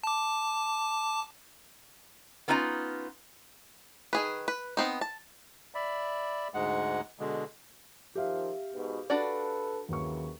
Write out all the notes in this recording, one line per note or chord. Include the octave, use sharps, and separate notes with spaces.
A5 D6
B3 C#4 D#4 F4 F5 A#5
D#3 G#4 B4
B4
B3 C4 D#4
A5
D5 E5 B5
D2 G#2 G#3 F#5
B2 D3 G#3
D#3 F3 G4 E5 F5
G#2 B2
D4 F#4 A4 B4 D5
D#2 C#3 E3 F#3 C#6